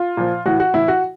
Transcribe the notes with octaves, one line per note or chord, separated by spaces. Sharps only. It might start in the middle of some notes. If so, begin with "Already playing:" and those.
Already playing: F4
A#2 F3
A2 E3 F#4
F#4
A2 E3 E4
F#4